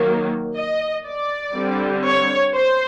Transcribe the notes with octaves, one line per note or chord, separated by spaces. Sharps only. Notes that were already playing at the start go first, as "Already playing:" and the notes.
Already playing: D#3 F#3 A#3
D#5
D5
D3 G3 C4
C#5
C5